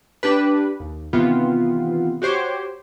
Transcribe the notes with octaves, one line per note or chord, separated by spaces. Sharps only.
D4 G4 B4
D#2
C3 D#3 E3 B3 C4 F4
F#4 G4 C5 C#5